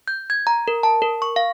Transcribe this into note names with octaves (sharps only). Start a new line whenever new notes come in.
G6
G#6
A#5
A#4
A5
A#4
C#6
F5